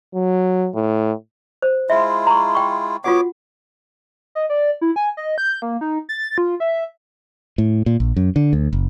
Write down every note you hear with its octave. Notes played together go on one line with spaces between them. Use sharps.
F#3
A2
C5
G#3 E4 F4 E5
A#5 C#6
G5 C#6
B3 F4 F#4 C#5 F#5 D6
D#5
D5
E4
G#5
D#5
G6
A#3
D#4
A6
F4
E5
A2
A#2
A#1
F#2
D3
D2
F#1